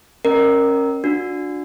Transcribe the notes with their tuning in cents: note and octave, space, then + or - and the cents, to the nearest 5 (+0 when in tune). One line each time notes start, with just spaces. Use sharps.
C#4 -20 A#4 +0 D#5 -45
D4 +5 F#4 -35